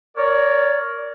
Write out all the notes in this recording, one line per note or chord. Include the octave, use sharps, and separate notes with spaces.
A#4 C#5 D5